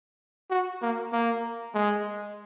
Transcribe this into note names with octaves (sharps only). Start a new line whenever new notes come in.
F#4
A#3
A#3
G#3